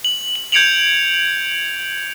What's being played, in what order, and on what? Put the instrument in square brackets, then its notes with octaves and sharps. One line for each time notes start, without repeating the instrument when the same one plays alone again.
[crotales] F#7
F#7
G6 G#6 C#7 D7 F7 F#7